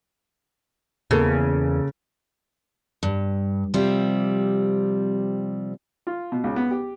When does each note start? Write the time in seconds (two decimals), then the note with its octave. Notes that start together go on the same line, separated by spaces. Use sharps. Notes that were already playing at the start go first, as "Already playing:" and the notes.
1.11 E2 C#3 A#3 A4
3.03 G2
3.74 C3 F3 G3 C4
6.07 F4
6.32 B2
6.44 C#2
6.56 B3
6.71 G4